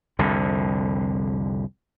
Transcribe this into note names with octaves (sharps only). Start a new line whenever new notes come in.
C2 F2 D3